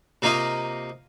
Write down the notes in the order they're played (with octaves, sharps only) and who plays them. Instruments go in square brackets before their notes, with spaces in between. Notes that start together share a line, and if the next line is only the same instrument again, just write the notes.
[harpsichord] C3 A#3 D#4 F4 D#5